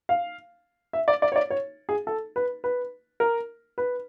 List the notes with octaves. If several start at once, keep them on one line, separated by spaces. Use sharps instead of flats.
F5
E5
D5
D5
C#5
D5
C#5
G#4
A4
B4
B4
A#4
B4